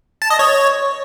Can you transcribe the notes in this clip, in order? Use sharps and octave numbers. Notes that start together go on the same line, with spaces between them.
A5
D#5
C#5